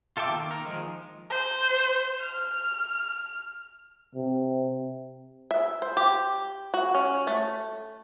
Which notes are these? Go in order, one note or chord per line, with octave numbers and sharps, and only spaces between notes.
F4 A4 E5 G5 D6
D#3 A#3
A#4
D#3 F3 G#3
C5
F6
C3
E5
C5
G4
F#4
C#4
A3